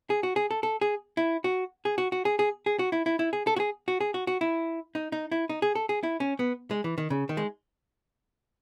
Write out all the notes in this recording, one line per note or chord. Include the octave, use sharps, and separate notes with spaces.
G#4
F#4
G#4
A4
A4
G#4
E4
F#4
G#4
F#4
F#4
G#4
G#4
G#4
F#4
E4
E4
E4
G#4
A4
F#4
G#4
F#4
G#4
F#4
F#4
E4
D#4
D#4
E4
D#4
G#4
A4
G#4
E4
C#4
B3
G#3
E3
D#3
C#3
D#3
G#3